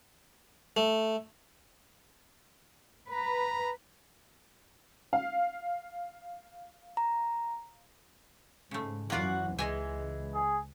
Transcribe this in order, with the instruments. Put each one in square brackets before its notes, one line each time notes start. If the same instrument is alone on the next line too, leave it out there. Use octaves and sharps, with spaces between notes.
[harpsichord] A3
[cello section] B4 [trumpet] A#5
[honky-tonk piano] F5
[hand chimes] A#5
[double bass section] G#2 [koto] C#3 A3
[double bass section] F#2 E3 [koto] A#3 F4 D5 [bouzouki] F#4 F#5
[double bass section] C#2 [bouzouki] E3 G#3 [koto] D#5 G#5
[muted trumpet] G#4